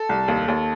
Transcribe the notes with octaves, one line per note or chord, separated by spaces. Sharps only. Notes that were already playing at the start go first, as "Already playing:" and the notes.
Already playing: A4
C2
D#2
D#2